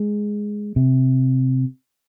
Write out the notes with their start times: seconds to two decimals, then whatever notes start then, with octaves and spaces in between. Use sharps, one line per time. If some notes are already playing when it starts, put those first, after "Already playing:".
Already playing: G#3
0.76 C3